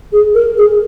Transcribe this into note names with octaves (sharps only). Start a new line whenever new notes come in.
G#4
A#4
G#4